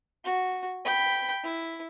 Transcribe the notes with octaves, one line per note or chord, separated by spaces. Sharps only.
F#4
G5 B5
E4